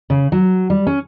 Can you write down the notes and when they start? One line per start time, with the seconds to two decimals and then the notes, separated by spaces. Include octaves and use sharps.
0.10 C#3
0.32 F#3
0.70 G3
0.87 C#4